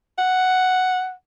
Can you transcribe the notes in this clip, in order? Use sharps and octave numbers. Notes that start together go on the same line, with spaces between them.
F#5